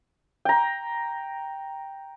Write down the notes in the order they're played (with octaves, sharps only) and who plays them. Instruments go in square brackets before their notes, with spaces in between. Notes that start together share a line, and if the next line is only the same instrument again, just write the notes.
[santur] G5 A#5